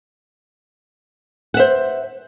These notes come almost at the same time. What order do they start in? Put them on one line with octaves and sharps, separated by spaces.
F#5 E5 C5